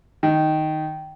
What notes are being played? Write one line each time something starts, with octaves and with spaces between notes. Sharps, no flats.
D#3